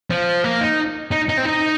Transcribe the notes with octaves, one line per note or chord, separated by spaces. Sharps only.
F3
A#3
D#4
D#4
D#4
C4
D#4